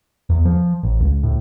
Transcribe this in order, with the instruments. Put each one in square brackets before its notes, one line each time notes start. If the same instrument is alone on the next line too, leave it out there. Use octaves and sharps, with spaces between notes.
[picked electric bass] E2
F3
A1
C#2
A2